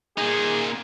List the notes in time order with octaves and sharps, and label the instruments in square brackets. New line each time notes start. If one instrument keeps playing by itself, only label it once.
[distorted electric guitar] A#2 D#4 [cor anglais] G#4